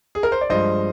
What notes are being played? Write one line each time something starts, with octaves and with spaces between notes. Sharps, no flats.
G#4
A#4
C5
D5
G2 F3 G#3 C5 D#5